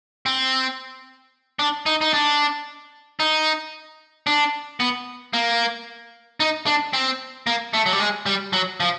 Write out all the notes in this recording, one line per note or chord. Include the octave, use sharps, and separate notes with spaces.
C4
D4
D#4
D#4
D4
D#4
D4
B3
A#3
D#4
D4
C4
A#3
A3
F#3
G3
G#3
G3
F#3
F3